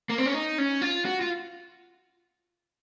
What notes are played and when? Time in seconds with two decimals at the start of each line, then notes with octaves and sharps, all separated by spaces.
0.10 A#3
0.18 C4
0.26 C#4
0.34 D#4
0.58 C#4
0.81 F4
1.05 F#4
1.21 F4